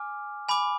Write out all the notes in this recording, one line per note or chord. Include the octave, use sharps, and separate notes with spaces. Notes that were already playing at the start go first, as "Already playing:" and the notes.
Already playing: G#5 D6 F6
G#5 B5 D6